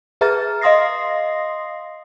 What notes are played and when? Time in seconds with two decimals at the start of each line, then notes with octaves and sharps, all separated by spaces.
0.21 G#4 B4 E5 A#5 F6 A6
0.61 D#5 F5 C6 D#6 A#6 C7